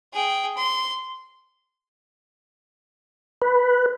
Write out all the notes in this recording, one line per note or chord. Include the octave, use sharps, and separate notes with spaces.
G#4 G5
C6
B4